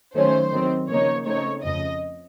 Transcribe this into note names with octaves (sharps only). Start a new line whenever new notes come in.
D#3 F#3 A3 C#4 C5
D#3 F#3 C4
C#3 F3 A#3 D#4 C#5
C#3 A3 C4 D#4 C#5
F2 C#3 F3 D#5